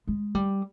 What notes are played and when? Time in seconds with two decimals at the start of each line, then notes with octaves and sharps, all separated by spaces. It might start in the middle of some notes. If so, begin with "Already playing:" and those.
0.07 G#3
0.35 G3